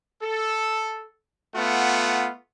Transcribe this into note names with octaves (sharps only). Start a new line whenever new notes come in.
A4
A3 B3 F4 F#5